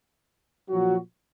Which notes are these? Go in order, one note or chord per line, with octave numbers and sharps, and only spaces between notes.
A#2 F3 F#3 F#4